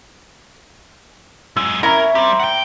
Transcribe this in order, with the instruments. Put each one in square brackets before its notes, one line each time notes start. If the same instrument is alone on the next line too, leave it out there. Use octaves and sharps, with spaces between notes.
[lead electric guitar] F#3 G#3 [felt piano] E6
[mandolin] C#4 E4 [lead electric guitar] A#4 [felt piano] A#5
[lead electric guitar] G3 G4 [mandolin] C4
[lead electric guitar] F#5 G5